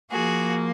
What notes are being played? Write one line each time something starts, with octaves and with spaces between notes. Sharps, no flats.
F3 A#3 F#4 G#4